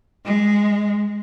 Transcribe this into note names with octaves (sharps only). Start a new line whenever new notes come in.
G#3